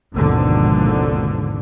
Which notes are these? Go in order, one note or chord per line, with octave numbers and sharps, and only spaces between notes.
G#1 D#2 G#2 B2 D3 F3